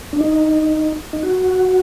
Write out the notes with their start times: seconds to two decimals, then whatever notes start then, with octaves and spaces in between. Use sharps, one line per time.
0.13 D4
0.20 D#4
1.13 D#4
1.23 F#4